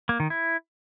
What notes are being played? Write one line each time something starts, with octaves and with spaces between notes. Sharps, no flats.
A#3
D#3
E4